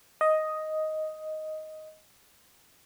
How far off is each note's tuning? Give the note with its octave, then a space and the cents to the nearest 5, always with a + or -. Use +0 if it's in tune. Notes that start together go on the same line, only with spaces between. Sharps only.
D#5 +5